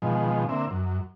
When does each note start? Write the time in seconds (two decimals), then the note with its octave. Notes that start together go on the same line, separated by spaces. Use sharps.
0.02 B2 D#3 F3 G#3
0.49 D3 A#3 C4 E5
0.71 F#2